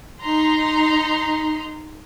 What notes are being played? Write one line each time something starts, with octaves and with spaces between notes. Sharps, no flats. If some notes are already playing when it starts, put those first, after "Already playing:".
D#4 A#5 C6